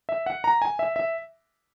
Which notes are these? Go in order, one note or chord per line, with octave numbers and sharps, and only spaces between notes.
E5
F#5
A#5
G#5
E5
E5